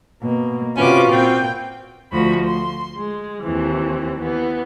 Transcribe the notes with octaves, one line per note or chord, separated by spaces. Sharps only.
B2 A#3
C3 C#4 F4 F#4 B4 D6
A#2 C4 G5
D2 F3 F#4 B5
C6
G#3
D#2 E3 C4
E3 B3